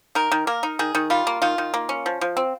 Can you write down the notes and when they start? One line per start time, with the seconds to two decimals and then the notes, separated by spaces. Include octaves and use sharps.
0.15 D#3 A#4
0.32 D#3
0.47 A#3 A#4
0.63 D#4
0.79 D#3 G#4
0.95 D#3
1.10 G3 F4
1.27 A#3
1.42 D#3 F4
1.58 D#3
1.74 A#3
1.89 C#4
2.06 F3
2.21 F3
2.37 C4